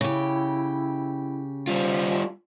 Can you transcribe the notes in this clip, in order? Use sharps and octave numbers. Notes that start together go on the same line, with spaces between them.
C#3 E4 G4
G3 F4 C5